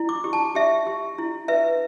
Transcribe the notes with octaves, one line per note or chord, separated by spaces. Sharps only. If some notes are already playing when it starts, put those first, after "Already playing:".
Already playing: E4
D6
G4
A5
G4 E5
G4
E4
B4 E5